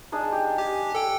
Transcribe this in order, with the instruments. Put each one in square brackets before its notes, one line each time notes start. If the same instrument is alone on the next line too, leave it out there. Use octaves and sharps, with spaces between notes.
[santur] D4 D#4 G#4
G4
[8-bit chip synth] G4 [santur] G#5
[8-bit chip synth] A4 G5